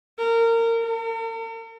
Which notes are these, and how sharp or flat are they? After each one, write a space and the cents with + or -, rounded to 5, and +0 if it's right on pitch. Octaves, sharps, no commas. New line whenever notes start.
A#4 -25
A#4 -45